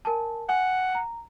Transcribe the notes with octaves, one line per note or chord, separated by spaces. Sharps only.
A#4 G#5 A5
F#5 G#5
A#5